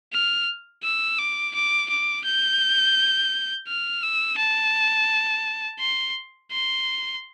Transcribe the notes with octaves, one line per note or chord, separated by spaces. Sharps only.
F6
E6
D6
D6
D6
G6
F6
E6
A5
C6
C6